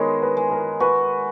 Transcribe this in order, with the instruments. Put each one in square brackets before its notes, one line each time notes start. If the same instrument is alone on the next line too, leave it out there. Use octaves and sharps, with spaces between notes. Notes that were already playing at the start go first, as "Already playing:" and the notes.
Already playing: [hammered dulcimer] D#3 G#3 B3 [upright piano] B4 C#5 D#5
[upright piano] B4
[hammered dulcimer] G#3
[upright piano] A#4
[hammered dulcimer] F#4 [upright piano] B4